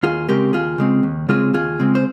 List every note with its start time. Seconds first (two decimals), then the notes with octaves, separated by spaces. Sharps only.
0.03 D#2 F4 G#4
0.28 C#3 G#3 C4 G4 A#4
0.53 D#2 F4 G#4
0.78 C#3 G#3 C4
1.03 D#2
1.29 C#3 G#3 C4 F4 G#4
1.54 D#2 F4 G#4
1.80 C#3 G#3 C4
1.95 C5